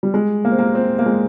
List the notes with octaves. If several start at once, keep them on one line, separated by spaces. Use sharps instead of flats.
G3
G#3
A#3
C4
A#3
C4
A#3
G#3